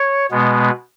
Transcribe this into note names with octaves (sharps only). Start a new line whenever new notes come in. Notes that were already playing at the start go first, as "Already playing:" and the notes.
Already playing: C#5
B2 G#3 B3